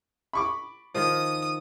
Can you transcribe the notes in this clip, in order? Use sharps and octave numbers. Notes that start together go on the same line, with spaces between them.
B5 C#6 D6
D#3 F3 D#6